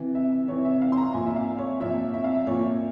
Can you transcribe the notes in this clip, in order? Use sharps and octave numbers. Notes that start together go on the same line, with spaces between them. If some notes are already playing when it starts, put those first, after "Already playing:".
Already playing: C3 E3
E5
C3 E3 C#5
E5
F5
C6
A#5
A#2 F3 G#5
E5
F5
C#5
A#2 F3 E5
E5
F5
E5
A#2 F3 C#5